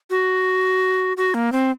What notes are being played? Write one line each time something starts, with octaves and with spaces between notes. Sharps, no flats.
F#4
F#4
A#3
C4